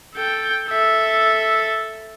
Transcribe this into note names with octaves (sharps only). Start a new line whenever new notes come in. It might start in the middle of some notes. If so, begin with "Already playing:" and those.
A4 G5
A4 E5